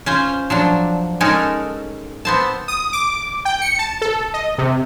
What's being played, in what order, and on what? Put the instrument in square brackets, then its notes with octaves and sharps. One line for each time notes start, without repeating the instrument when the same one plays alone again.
[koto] C#4 F4 C5
F3 F#3 D4
G#3 C#4 D#4 A4 A#4
B3 C4 A5
[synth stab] D#6
D6
G5
C#7
A5
A4
D#5
C3